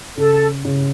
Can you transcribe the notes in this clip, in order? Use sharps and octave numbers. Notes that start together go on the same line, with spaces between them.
C#3 A4
C#3